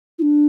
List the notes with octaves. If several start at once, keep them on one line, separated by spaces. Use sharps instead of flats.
E4
D4